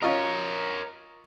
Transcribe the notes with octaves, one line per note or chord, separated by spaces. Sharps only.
C#4 F4 A#4 C#5 D#5